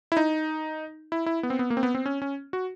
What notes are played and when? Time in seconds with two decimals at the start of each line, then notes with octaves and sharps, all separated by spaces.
0.12 E4
0.17 D#4
1.12 E4
1.26 E4
1.43 B3
1.50 C4
1.59 B3
1.70 A#3
1.77 C4
1.83 B3
1.95 C4
2.06 C#4
2.22 C#4
2.53 F#4